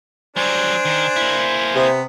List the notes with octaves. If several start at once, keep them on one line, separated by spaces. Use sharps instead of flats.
F#3 G3 D4 C5 G#5
D#3
A#3 E4
C3 B3